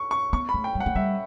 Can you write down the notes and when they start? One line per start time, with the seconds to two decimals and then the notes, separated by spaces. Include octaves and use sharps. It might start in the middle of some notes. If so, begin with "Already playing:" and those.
Already playing: C#6
0.11 C#6
0.33 B3 C#6
0.49 B5
0.54 A3
0.64 G5
0.75 G3
0.80 F#5
0.86 A3
0.96 G3 E5